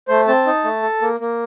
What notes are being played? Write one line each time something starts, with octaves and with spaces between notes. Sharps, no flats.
A3 C5
C4 A5
D#4
A3
A4
A#3
A#3